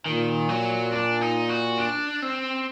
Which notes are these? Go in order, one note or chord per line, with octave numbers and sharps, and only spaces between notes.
A#2 D#3
F#3
D4
D#4
F#4
D4
C4